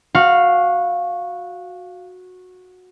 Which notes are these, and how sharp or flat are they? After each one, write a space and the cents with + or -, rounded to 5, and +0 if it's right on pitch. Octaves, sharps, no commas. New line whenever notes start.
F#4 -15 F5 +0